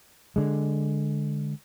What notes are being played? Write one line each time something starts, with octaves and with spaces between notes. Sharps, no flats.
D3 G#3